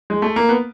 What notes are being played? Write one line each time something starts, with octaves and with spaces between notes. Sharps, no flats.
G#3
A3
A#3
B3